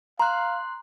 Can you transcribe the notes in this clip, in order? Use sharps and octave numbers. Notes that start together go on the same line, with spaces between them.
F5 A#5 C6 F#6